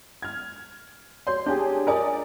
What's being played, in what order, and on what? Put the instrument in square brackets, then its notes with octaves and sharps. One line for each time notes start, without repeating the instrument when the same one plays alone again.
[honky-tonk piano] F6 G#6
[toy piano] F#4 C#5 D5 [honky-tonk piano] C6
[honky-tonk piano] D4 G4 G#4 [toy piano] C#5
[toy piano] F4 G#5 D#6 [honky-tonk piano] A#4 D5 D#5